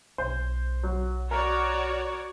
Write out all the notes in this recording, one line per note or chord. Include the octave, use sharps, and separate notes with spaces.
B1 C5
F#3
F#4 A#4 C#5 D5